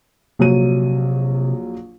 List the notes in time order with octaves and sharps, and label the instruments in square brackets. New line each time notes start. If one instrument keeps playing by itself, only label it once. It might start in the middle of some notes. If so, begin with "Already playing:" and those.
[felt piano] A#1 F#3 D#7 [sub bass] C3